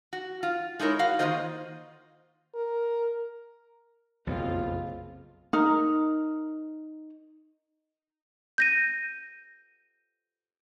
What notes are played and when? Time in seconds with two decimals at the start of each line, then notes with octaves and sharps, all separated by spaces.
0.13 F#4
0.43 F4
0.79 G#3 D#4 E4 A#4 C#5
0.99 F#4 F5
1.19 D#3 E3 A#3 F4 C5 D#5
2.55 A#4
4.27 F#1 B1 F2 C3 C4 F4 F5
5.53 D#4 A#4
8.58 G6 A#6 D#7